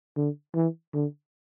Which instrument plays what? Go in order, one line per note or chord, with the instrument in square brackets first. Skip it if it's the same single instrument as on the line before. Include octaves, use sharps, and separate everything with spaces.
[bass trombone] D3
E3
D3